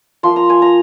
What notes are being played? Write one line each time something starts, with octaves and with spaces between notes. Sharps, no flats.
F3 A#3 F4 C6
A#5
G#5
A#5